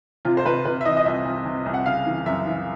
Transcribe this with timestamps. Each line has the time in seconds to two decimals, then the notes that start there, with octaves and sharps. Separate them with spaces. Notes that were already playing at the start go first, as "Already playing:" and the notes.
0.25 C3 F4
0.37 C5
0.45 C3 B4
0.65 C3 B4
0.81 E5
0.85 E3 D#5
0.97 D#5
1.05 C2 E5
1.26 C2
1.45 C3
1.66 C2
1.74 F#5
1.86 C#3 F5
2.06 E3
2.26 F#2 E5
2.46 E3